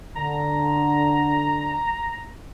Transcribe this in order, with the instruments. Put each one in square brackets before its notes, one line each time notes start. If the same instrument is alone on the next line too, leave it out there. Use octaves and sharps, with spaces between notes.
[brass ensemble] D3 [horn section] A#5